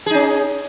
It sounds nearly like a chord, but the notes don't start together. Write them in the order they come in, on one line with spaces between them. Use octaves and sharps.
G#4 D#4 C#4